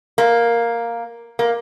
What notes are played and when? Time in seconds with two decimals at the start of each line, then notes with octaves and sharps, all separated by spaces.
0.18 A#3
1.39 A#3